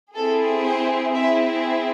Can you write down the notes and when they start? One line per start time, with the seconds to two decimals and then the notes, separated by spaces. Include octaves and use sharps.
0.15 C4 E4 G#4 A4
0.64 C5
1.14 C4 E4 G#4 E5